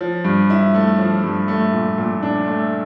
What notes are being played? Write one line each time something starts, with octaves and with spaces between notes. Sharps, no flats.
F3
G2
E4
A3
F3
G2
A3
A#2
A#2
D4
A3